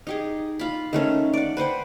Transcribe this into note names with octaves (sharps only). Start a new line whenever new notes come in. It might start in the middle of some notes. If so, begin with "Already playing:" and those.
D#4 G4 G#4
F4 B5
D#3 A3 C#4
D5 F#5
B4 C5 F#5 G5